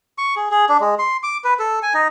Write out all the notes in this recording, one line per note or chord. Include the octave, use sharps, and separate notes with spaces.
C#6
G#4
G#4
D4
G#3
C6
D6
B4
A4
G#5
D#4